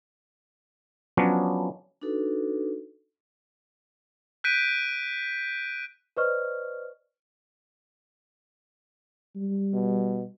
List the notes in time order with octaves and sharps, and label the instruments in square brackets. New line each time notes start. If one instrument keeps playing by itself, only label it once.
[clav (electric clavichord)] F3 F#3 B3 C#4 D4
[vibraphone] D4 D#4 F#4 A4 B4
[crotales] F#6 G6 B6 D7 D#7
[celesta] B4 C5 D5 D#5 C#6 F6
[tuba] G3
[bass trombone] B2